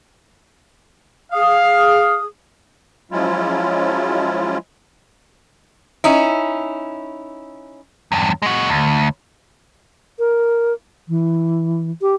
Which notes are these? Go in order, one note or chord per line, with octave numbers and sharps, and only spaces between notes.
G#4 F5 D#6
F3 F#3 G#3 C#4 E4 F4
C#4 D#4 E4
E2 G2
G#3 F#4
D2
A#4
E3
G4